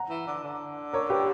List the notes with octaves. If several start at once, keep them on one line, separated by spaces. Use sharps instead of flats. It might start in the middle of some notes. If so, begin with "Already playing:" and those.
Already playing: F#5 A#5
E3
D3
D3
A#4 C#5
G4 B4